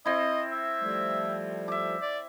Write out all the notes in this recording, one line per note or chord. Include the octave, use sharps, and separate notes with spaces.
C4 E4 D#5
E5
F3 G3 A3
E5 D6
D5